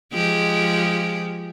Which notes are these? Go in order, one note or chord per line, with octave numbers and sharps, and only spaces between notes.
F3 G#3 G4